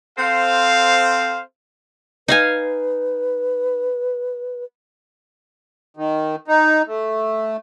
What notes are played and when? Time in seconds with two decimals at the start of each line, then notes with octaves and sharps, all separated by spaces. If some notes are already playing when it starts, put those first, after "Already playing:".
0.18 C4 A4 C5 F5
2.28 D#4 B4 F5 G#5
5.97 D#3
6.48 D#4
6.87 A3